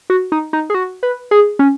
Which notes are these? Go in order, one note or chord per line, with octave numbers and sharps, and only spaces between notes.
F#4
D#4
D#4
G#4
F#4
B4
G#4
C#4